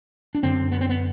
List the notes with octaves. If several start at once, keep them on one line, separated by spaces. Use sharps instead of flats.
D4
F#2 D3 C4
B3
C4
B3